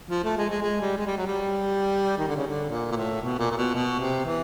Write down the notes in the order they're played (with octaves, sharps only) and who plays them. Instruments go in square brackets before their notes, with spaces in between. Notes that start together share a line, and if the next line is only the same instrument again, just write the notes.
[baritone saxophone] F3
A3
G#3
G#3
G#3
G3
G#3
G3
F#3
G3
D#3
D3
C#3
D3
A#2
A#2
A2
B2
A#2
A#2
B2
B2
C3
E3